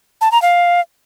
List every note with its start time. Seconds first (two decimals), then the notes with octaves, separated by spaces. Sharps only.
0.21 A5
0.32 A#5
0.42 F5